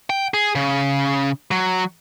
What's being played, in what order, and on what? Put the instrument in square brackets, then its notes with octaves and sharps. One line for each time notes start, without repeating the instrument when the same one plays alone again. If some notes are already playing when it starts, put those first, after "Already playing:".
[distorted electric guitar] G5
G#4
C#3
F#3